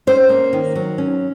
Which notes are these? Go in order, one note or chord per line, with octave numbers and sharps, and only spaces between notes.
C#4 C5
A#3
D#3
F#3
C#4